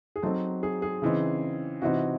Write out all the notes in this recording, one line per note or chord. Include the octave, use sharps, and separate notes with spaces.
G#4
F#3 C4 D#4 A4
G#4
G#4
C#3 E3 C4 D#4
C3 E3 C4 D#4 F#4